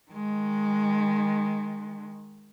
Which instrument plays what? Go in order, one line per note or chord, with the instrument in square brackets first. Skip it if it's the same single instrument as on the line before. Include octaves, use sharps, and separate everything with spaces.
[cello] D#3 G#3